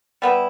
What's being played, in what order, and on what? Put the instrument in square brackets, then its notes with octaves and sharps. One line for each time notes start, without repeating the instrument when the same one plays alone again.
[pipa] G3 B3 E4